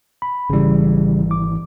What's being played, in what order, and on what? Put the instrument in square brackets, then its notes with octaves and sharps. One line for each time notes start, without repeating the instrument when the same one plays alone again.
[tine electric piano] B5
[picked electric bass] G#1 E3 [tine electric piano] C#3 G3
[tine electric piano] D6